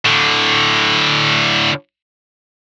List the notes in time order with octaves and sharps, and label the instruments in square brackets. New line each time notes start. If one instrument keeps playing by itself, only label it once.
[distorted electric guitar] A2 D3